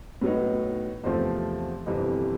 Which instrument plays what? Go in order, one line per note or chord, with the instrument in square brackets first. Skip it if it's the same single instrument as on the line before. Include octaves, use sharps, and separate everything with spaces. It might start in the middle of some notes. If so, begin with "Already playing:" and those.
[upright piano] A2 F#3 B3 D#4
E2 C3 F3 A3 C4 C5
G1 F2 C3 E3 G3